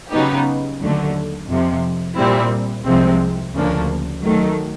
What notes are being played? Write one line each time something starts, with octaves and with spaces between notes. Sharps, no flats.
C#3 F#3 B3 D#4 G4
D#2 D3 F#3 A3
F2 C3 F3
A#2 G3 C4 E4
C2 C3 F3 G#3 C4
D2 C#3 F3 A#3 D4
D#3 F#3 A3